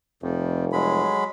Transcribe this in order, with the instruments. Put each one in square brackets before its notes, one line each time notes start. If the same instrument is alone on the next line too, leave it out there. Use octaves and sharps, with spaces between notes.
[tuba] F1 [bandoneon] F2
[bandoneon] F#3 G#3 B5